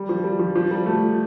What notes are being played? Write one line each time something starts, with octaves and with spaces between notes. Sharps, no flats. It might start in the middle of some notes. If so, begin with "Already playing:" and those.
Already playing: G3
F3
G3
F3
F3
G3
A3